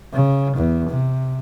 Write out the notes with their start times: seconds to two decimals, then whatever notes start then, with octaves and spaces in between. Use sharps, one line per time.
0.13 C#3
0.56 E2
0.89 C3